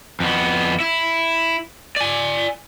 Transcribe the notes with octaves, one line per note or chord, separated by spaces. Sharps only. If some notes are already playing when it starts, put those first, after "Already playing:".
F2 B3
E4
D5 G#5